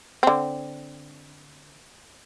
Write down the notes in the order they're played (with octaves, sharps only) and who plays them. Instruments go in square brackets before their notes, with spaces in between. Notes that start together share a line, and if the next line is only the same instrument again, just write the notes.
[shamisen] D3 C4